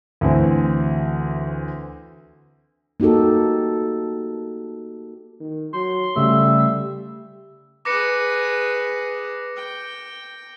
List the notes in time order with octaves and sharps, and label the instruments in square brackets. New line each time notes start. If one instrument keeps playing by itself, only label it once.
[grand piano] D2 E3 C4
[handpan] A#3 D#4 F#4 G4 A4
[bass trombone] D#3
[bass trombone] F#3 [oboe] C6
[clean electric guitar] C#3 A3 [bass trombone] G3 [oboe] E5
[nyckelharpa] G#4 B4 [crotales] D6 A#6 C#7
[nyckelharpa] G5